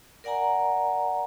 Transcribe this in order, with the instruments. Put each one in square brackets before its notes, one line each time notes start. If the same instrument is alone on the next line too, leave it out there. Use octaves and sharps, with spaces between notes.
[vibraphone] A#4 D5 F#5 G#5 A#5